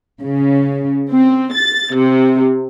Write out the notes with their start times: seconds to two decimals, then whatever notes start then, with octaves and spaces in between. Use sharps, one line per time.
0.22 C#3
1.13 C4
1.55 A6
1.96 C3